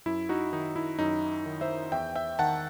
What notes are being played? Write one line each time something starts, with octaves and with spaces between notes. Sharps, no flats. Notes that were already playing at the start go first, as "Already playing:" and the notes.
F#2 E4
D#4 F#4
D#3 D#4
E4
F#2 D#4
D#3
C5 E5
E2 E5 G5
E5 G5
D#3 F#5 A5